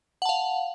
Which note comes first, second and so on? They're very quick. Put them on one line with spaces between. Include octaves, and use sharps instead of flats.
F#5 A5 F5